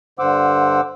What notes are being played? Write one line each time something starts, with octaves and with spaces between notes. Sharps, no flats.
G2 D3 C5 F#5 D6 E6